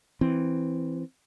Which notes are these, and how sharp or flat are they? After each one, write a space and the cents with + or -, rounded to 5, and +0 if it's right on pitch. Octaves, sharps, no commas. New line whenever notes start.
E3 +0 C4 +0